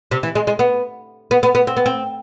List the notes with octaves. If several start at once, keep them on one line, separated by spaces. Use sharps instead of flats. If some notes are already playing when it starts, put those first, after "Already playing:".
C3
E3
G#3
G#3
B3
B3
B3
B3
C4
B3
C4